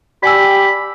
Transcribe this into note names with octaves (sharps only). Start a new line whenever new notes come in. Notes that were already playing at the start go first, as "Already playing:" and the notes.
G4 D5 G#5 B5 E6